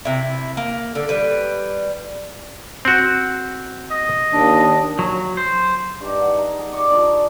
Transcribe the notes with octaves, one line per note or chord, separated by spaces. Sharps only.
C3 E4
A#3
D3
G3 B4
C4 F#4
D#5
D#2 D4
F#3
C5
G2 D#3
F#5
D#5 A#5
G#4
D5 D#5 C#6
D4 F4 A#4